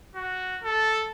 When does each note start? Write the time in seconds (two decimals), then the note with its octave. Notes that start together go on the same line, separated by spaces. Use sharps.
0.15 F#4
0.63 A4